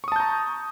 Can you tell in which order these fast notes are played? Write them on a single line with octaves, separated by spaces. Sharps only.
C#6 D#6 A5 G6 A#5